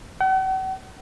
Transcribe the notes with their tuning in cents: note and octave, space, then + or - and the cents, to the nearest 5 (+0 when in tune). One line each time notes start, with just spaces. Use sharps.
F#5 +45